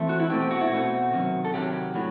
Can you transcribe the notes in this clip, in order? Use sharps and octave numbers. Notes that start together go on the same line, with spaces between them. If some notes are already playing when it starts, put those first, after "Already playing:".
Already playing: E3 A3 C4
F#4
E4
B2 A3 C4 G4
G4
F#4
E4
B2 A3 C4 F#4
C3 D#3 F#3
A4
C3 D#3 F#3 G4
A2 F#3